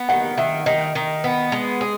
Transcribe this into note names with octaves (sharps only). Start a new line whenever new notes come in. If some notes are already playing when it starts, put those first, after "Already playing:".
Already playing: B3
D#3 F#5
D#3 E5
D#3 D#5
D#3
B3
G#3
G#4